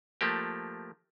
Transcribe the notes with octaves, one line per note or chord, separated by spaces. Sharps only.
F3 A3 A#3 G4